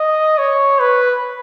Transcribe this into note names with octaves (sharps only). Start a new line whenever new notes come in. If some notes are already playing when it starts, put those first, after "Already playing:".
Already playing: D#5
C#5
B4